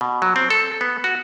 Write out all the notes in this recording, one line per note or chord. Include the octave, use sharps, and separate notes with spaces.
B2
F#3
C4
A4
B3
F#4